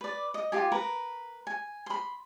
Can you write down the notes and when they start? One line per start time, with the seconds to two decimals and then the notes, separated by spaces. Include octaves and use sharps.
0.01 B4 D5
0.34 D#5
0.52 F4 G4 G#5
0.72 A#4 B4 A#5
1.47 G#5
1.86 B5 C6